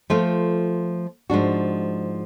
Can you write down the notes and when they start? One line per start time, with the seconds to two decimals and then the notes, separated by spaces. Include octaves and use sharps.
0.10 F3 A3 F4
1.30 G#2 F3 G#3 D4 F#4